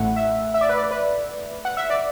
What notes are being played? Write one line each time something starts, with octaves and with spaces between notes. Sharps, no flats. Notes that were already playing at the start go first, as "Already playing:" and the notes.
Already playing: A1 A2 A3 E4 F#5
E5
E5
D5
B4
D5
B4
F#5
E5
D5